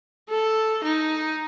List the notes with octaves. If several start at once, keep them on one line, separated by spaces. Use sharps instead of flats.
A4
D#4